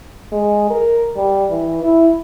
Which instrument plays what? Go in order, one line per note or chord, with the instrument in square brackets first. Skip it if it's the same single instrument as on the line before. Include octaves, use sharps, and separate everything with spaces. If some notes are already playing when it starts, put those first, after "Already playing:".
[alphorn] G#3
A#4
G3
E3
E4